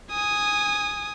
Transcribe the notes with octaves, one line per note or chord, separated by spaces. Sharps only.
G#5 D#6